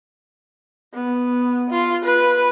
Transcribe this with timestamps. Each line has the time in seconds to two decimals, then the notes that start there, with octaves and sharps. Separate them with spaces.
0.94 B3
1.71 F4
2.05 B4